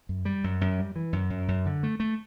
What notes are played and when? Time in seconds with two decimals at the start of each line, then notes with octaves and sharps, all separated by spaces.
0.09 F#2
0.25 G3
0.44 F#2
0.61 F#2
0.79 G3
0.96 E3
1.13 F#2
1.30 F#2
1.48 F#2
1.66 D3
1.83 A3
2.00 A3